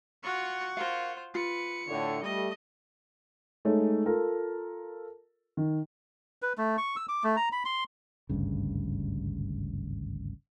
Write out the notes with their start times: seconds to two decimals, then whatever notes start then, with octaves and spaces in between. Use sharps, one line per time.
0.23 F4 F#4 F#5 C#6
0.77 F4 A#4 C5 F5
1.35 F4 B4 C#7
1.89 A2 D3 C#5
2.23 G3 A3 D#5
3.65 G#3 A3 D#4 C#5
4.06 F4 A4 A#4
5.57 D#3
6.42 B4
6.58 A3
6.78 C#6
6.96 E6
7.09 D6
7.24 A3
7.37 A#5
7.52 B5
7.65 C6
8.29 G#1 D2 G2 C#3